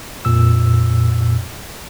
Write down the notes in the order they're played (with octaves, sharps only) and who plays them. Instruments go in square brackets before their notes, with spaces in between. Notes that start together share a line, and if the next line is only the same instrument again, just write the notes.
[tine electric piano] F2 A#2 E6